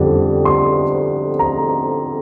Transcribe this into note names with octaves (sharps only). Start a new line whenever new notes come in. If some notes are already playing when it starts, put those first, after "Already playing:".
Already playing: F2 D3 G3 D4
C6
A#5